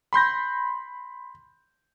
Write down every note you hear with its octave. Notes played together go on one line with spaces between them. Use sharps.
B5 C6 G6 A#6